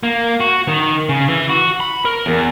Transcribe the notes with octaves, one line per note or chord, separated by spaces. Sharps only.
A#3
F#4
D#3
C#3
E3
F#4
B5
A#4
E2